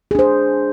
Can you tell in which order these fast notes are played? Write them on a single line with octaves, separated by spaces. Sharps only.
G#4 D4 C5